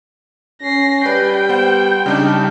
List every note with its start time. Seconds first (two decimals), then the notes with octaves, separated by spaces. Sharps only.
0.62 C#4 A#6 C7
1.06 G3 B4 D5 G5
1.49 B3 C5 F#5
2.06 C#3 G3 D4 D#4